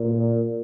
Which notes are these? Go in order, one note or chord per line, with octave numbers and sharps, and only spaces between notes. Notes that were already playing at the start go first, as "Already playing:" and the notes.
Already playing: A#2